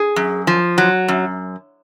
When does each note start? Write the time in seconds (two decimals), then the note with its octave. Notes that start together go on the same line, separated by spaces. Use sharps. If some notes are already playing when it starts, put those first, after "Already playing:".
Already playing: G#4
0.16 F#2
0.47 F3
0.78 F#3
1.08 F#2